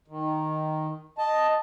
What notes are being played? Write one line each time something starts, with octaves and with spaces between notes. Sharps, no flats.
D#3
D#5 A5